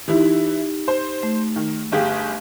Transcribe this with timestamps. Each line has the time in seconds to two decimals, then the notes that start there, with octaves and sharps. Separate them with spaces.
0.08 E3 D#4 E4 G4
0.88 C5
1.23 A3
1.56 D#3
1.92 G1 G4 G#4 F5